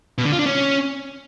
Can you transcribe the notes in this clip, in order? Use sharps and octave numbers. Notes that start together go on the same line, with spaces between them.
B2
D3
F4
D4
C#4